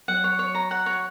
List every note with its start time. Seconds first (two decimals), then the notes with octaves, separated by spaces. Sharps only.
0.08 F#3 F#5
0.24 C#5
0.39 C#5
0.55 A#5
0.71 F#5
0.86 C#5